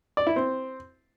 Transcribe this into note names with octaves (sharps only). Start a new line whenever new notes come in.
D5
E4
C4